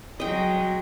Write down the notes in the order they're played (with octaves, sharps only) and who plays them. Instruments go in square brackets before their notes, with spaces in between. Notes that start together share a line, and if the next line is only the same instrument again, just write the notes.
[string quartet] F#3 G#3 [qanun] D#5 G5